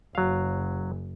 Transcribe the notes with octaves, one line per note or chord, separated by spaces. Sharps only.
F#1 F#3 F5